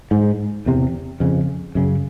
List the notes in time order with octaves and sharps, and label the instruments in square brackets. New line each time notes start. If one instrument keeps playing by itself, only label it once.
[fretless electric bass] G#2
E2 C3
F2 C#3
F#2 C#3